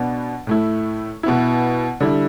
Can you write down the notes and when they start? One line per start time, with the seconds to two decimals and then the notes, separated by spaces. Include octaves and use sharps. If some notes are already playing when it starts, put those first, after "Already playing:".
Already playing: B2 B3 D4
0.47 A2 A3 E4
1.23 B2 B3 E4
2.00 D3 G3 E4